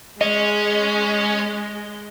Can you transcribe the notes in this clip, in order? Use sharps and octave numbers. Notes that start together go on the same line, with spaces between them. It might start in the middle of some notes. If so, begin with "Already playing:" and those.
G#3 C#4 D#5